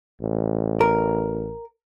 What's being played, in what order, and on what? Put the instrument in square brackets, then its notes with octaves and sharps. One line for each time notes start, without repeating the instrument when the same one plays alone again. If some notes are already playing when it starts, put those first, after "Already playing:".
[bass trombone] A1
[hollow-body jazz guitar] A#4